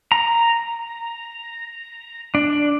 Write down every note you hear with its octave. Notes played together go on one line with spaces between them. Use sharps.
A#5
D4